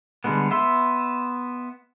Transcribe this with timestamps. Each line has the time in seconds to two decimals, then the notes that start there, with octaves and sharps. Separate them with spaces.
0.24 D3 G3 G#3 B3
0.51 B3 E5 C6